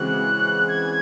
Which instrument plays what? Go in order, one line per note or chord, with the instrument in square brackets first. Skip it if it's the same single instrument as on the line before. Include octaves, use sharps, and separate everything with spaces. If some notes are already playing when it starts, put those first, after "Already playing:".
Already playing: [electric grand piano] C#3 E3 G#3 C4 F#4 [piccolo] F#6
[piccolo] G#6